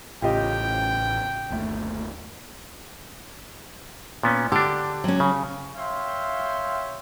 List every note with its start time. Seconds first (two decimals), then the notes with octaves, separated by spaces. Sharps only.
0.22 A1 A2 C#3 F4 G4 D#5 G5
1.50 G1 D#2 A3
4.23 A#2 B3 C#4
4.52 D3 D4 G4
5.04 F#3 C#4
5.20 C#3
5.75 C#5 E5 F5 G5 C6